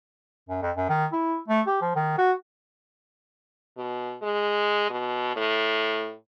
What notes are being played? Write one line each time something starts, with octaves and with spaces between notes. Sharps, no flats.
F#2
F2
F#2
D#3
E4
A3
G4
F3
D#3
F#4
B2
G#3
B2
A2